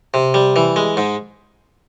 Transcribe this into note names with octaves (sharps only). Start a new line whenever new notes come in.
C3
G3
E3
G#3
G#2